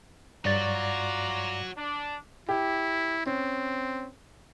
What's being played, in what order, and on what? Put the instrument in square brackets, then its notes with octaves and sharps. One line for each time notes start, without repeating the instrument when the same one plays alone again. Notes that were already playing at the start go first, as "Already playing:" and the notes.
[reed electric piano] G2 D5 A6 [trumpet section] F4 A#5 D6 [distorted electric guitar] F#4 C#5
[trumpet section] D4
[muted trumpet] E4 [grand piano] G4
[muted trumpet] C4 [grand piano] C#4